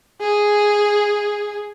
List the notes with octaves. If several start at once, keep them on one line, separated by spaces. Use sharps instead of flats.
G#4